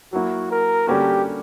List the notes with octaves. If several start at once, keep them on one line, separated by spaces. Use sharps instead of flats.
F#3 A#3 E4 F#4
A#4
D3 G3 A#3 C#4 F#4 G4